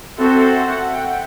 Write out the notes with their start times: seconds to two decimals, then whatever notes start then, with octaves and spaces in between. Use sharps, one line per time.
0.18 C4 F#4 A4 C5 E5
0.43 F#5
0.67 F#5
0.92 G5